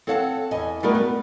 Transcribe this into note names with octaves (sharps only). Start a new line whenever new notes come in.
C4 A4 C#5 F5 F#5 A5
E2 D#5 G#5
G3 A3 B3 F#4 G#4 A#4
B3